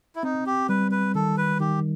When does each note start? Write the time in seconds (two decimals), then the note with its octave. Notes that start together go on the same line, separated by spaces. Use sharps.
0.16 E4
0.23 C4 D#4
0.46 G4
0.69 G3 B4
0.92 B4
1.15 D#3 A4
1.37 B4
1.60 D#3 G4